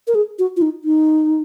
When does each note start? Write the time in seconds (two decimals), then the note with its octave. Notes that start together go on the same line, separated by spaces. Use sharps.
0.07 A#4
0.15 G#4
0.39 F#4
0.57 F4
0.62 D#4
0.84 D#4